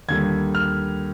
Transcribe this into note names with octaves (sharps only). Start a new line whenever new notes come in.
D#2 D3 G3 G#6
F6